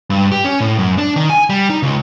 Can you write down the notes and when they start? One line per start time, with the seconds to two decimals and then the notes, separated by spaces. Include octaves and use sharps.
0.10 G2
0.32 G4
0.45 C#4
0.60 A2
0.79 F#2
0.98 D4
1.16 D#3
1.30 G#5
1.50 G3
1.70 D#4
1.83 C#2